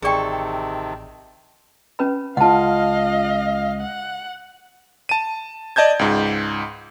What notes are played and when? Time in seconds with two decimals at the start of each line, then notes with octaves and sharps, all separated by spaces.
0.02 A1 C3 D#3 G#4 A4 D5 G5 C#6
1.99 C#4 B4 B5
2.37 C#2 F4 D#5 F5 F#5 A5
3.81 F#5
5.09 A5 D#7
5.76 D5 D#5 A5 G6 G#6
5.99 C#2 G#2